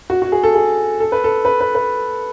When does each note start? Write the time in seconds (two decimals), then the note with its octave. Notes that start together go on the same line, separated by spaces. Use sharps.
0.10 F#4
0.22 F#4
0.32 G#4
0.43 A4
0.55 G#4
1.00 A4
1.12 B4
1.24 A4
1.45 B4
1.60 B4
1.75 B4